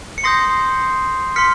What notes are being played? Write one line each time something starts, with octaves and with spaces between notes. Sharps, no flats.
C#7
C6 D#6 G6 A#6 C7
C6 F6 B6 C#7